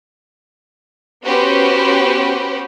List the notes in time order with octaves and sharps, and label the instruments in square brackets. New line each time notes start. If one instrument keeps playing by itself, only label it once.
[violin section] B3 C#4 F#4 G4 B4 C5